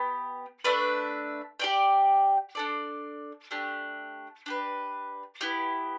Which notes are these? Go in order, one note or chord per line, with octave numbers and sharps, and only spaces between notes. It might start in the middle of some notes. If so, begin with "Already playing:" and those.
Already playing: B3 G4
A3 D4 B4 E5
G4 D5 G5
D4 A4 D5
A3 D4 G4
D4 G4 B4
B3 E4 G4